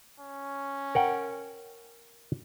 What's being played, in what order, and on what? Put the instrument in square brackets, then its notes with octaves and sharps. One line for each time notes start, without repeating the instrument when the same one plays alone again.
[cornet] C#4
[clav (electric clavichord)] A#4 F#5 G5